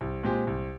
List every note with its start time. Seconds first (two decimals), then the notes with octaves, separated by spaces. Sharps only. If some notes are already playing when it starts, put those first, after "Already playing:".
0.01 C2
0.23 A#2 G#3 C4 G4
0.47 C2